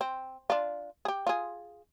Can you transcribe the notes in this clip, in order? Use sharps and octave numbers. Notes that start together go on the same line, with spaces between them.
C4
D4 F4
G4 G#4
F4 G#4